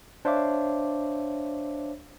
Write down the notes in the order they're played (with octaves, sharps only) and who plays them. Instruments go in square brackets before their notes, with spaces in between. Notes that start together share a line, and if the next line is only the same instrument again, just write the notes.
[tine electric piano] D4 C5 C#5 E5 F5 D6